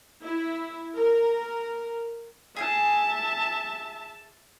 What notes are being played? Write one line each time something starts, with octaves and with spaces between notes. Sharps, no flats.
E4
A#4
G#4 E5 G#5 A5